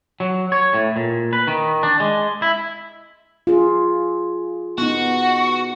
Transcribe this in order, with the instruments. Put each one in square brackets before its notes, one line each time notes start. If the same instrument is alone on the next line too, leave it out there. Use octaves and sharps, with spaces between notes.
[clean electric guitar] F#3
C#5
A2
A#2
B4
D#3
D4
G#3
E4
[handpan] F4 G#4
[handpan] B3 D#4 [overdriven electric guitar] F#4